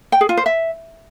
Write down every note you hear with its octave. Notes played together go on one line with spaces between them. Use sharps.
G5
G#4
F4
C5
E5